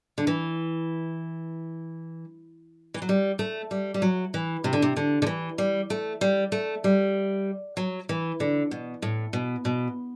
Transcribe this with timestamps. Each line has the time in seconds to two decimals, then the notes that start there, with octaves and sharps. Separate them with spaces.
0.18 D3
0.27 E3
2.94 E3
3.02 F#3
3.09 G3
3.39 A3
3.71 G3
3.94 G3
4.02 F#3
4.34 E3
4.64 C3
4.73 D3
4.82 C3
4.96 D3
5.22 D3
5.27 E3
5.58 G3
5.90 A3
6.21 G3
6.52 A3
6.84 G3
7.77 F#3
8.09 E3
8.40 D3
8.71 B2
9.02 A2
9.33 B2
9.65 B2